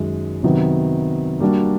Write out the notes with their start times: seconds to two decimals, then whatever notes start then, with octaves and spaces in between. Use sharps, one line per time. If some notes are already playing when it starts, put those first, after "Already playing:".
Already playing: F#2 D#3 G#3
0.43 C3 D#3 F#3 B3
1.40 G3 A#3 D4 F#4